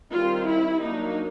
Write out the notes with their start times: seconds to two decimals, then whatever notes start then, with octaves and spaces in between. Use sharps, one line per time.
0.12 D#3 G3 C4 F4
0.47 E4
0.82 F#3 A#3 D4 D#4